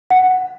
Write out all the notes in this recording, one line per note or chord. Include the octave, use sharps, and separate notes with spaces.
F#5